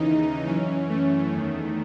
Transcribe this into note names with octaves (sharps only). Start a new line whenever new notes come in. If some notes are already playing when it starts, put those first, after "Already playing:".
Already playing: D#2 C#3 E3 D#4
F#2 E3 C#4
A3
E2 D#3